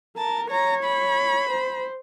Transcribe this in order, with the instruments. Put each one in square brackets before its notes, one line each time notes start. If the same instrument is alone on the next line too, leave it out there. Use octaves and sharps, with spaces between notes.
[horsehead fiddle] A#4 [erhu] A5
[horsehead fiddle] C#5 [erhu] A#5
[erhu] B5
[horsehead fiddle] C5